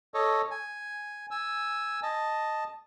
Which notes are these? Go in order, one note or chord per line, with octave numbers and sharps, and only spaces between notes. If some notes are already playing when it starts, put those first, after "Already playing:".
A4 C#5 D#5
G#5
G#5 E6
D#5 A5